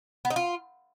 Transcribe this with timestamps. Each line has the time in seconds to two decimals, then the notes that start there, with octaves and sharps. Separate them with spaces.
0.25 B3
0.30 D#4
0.36 F4